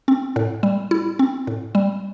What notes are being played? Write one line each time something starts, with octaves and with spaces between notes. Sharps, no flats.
C4
A2
G3
E4
C4
A2
G3